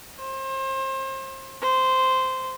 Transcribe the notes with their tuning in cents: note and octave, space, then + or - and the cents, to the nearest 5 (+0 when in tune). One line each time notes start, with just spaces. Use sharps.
C5 +35
C5 -10